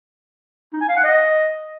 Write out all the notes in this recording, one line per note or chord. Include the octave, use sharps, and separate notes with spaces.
D#4
G#5
F5
F#5
D#5